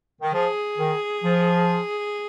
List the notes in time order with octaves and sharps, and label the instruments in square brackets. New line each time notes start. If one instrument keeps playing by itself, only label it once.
[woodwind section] D#3
[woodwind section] F3 [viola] G#4
[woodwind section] D#3
F3